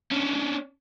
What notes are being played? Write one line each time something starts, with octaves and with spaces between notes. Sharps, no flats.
C#4 D4